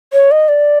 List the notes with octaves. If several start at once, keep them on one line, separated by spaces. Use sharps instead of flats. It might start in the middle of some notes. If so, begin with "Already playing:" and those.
C#5
D#5
D5